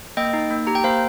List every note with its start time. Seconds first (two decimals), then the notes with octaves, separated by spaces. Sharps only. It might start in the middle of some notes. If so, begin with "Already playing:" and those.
0.17 A#3 D#5 G5
0.33 D#4
0.51 A#3
0.67 G4 A#5
0.75 G5
0.84 A#3 C5 F5